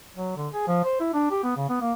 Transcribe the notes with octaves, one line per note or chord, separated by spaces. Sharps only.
F#3
D3
G#4
F3
C5
E4
D4
G4
B3
C#3
B3
A#3